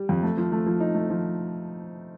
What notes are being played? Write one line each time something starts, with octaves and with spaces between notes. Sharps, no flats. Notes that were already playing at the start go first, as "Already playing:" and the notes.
Already playing: G3
F2
A3
F3
A3
F3
D#4
A3
F3